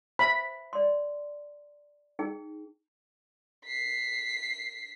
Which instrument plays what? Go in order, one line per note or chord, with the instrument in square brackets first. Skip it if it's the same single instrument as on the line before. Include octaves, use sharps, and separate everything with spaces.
[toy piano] C5 E5 G5 [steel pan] B5
[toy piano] D5 C6
D#4 G#4 G5
[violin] B6 C7